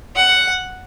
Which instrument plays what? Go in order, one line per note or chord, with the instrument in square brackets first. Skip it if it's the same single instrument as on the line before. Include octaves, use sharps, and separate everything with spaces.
[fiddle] F#5